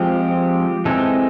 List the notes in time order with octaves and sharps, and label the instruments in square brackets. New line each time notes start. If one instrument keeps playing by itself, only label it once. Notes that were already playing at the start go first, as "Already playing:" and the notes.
Already playing: [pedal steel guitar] F3 G#3 C4 G4
E3 G#3 C4 A4